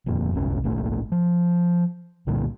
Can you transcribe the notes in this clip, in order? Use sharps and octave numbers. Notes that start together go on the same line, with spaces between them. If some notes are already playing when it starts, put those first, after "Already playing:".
D#1 F2 A#2
F#1 C2 C#4
G#1 C#2 A#2 A3
F3
C2 A#2 D3 G3